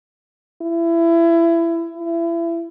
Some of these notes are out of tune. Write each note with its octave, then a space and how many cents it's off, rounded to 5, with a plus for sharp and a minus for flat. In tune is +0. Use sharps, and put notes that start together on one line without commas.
E4 +25
E4 +30